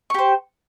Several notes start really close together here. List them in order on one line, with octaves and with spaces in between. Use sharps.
C#6 G4 C5